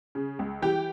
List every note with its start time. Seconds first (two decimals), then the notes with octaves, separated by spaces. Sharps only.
0.15 C#3
0.39 C#2
0.62 E3 G4 G5